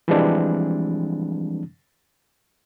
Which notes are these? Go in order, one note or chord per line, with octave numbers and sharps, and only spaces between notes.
E3 F3 G3 G#3 C4 D4